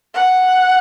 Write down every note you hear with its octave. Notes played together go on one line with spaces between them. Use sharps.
F#5